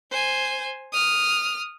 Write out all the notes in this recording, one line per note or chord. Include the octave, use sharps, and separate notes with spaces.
C5 G#5
D#6 F6